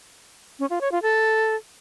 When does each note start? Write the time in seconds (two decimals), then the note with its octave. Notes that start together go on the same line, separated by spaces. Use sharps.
0.59 C#4
0.70 F4
0.81 C#5
0.92 F4
1.03 A4